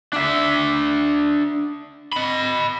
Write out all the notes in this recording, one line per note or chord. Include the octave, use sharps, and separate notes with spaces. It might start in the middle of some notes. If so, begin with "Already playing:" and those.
D4 E5
D#5 B5